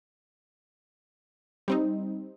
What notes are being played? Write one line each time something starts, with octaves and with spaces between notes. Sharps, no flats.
G3 C4 D#4